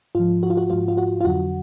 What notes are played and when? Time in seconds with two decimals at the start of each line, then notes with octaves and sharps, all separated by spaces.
0.15 G#2 F3 F4
0.43 F#4
0.50 F4
0.57 F#4
0.70 G#2 F3 F4
0.88 F4
0.97 F#4
1.21 F4
1.25 F2 D3 F#3 F#4